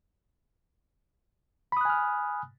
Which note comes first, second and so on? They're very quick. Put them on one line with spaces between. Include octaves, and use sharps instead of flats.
B5 D#6 F#6 G#5 F6